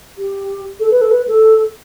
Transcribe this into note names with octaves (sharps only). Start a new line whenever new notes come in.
G4
A4
B4
A4
B4
A4